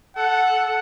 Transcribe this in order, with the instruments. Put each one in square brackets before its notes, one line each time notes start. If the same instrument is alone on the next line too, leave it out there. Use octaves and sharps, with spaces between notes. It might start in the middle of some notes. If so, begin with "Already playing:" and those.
[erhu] A4 [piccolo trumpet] F#5